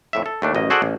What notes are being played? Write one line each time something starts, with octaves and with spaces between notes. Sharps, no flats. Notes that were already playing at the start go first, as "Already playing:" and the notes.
F2 A2 E5
A4
D#2 A3 D4
A1 F#2 D#5
F#4 G#4 A4 C5 D5 F#5
A1